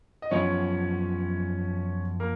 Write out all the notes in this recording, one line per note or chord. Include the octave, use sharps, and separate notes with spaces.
D#5
F#2 F3 B3 C#4 C#5
A#3 A#4